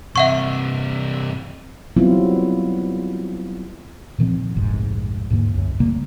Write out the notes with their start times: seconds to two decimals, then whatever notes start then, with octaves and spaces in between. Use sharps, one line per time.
0.16 G2 C3 E5 F#5 C#6
1.97 F#3 G3 B3 C4 E4 F4
4.18 A#2 D#3 F3 C4
4.56 F1 A#1 G#2
5.30 D#2 G#2 D3 A#3
5.54 C2 F#2
5.80 C#3 G3 A3 A#3